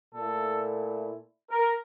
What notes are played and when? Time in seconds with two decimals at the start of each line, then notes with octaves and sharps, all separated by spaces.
0.14 A#2 A3 E4 A4
1.50 A#4